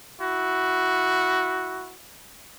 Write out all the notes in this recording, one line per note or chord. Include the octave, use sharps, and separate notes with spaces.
E4 F#4